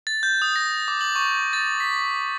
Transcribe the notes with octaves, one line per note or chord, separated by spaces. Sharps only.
A6
G6
D#6
A#6
D6
F#7
C#6
A6
B6